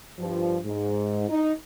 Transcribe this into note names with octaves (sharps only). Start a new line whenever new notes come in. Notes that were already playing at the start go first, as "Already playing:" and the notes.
G2 F3
G#2
D#4